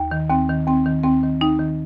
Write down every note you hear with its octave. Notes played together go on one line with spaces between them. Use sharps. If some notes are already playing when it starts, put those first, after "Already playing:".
Already playing: D#2
D#3
D#2 C4
D#3
D#2 C4
D#3
D#2 C4
D#3
D#2 D#4
D#3